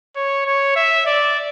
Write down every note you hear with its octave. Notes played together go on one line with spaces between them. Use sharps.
C#5
C#5
E5
D5